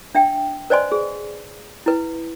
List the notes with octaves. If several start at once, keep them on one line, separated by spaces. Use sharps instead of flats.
D4 E5 G5
B4 C5 D5 D#5 G#5 C6
G#4
E4 B4